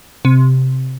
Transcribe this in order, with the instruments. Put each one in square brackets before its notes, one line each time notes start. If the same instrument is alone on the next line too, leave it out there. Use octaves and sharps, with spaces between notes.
[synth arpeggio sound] C3